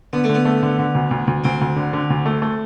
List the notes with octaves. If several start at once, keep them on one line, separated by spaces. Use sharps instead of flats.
D3 B3
A3
D3 B3
A3
D3
D3
D2
D2
D2
D2 C4
D2
D3
D3
D2
A3
A3